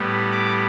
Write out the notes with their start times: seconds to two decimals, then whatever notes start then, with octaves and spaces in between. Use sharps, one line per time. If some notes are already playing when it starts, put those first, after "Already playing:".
Already playing: A2 G3 B3
0.31 D6